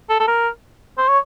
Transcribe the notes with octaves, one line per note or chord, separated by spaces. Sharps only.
A4
A4
A#4
C5
C#5